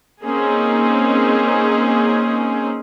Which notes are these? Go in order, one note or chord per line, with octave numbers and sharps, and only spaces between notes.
A#3 C4 C#4 D#4 G#4